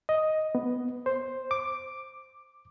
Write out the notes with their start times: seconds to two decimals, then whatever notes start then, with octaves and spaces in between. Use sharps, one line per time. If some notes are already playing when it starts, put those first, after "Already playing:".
0.09 D#5
0.55 B3
1.06 C5
1.51 D6